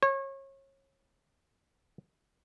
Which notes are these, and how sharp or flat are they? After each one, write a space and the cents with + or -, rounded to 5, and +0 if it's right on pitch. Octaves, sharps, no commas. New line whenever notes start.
C#5 -30